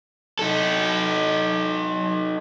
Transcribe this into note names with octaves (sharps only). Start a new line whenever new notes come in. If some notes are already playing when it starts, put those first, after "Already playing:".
D#4 A4